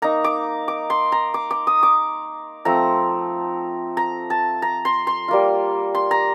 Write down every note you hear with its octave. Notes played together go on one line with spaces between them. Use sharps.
A#3 D#4 A#5
D6
D6
C6
A#5
D6
D6
D#6
D6
F3 A3 C4 A#5
A#5
A5
A#5
C6
C6
G3 A#3 F4
C6
A#5